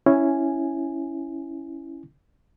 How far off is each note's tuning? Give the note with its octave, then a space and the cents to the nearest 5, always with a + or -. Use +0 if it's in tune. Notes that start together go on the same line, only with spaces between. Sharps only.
C#4 +0 E4 +0 G#5 +0